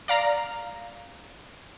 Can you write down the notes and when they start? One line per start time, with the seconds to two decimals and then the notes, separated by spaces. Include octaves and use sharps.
0.08 D5 F5 A#5